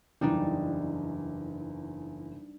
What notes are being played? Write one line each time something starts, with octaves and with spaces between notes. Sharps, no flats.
F#1 E2 G3 D4 D#4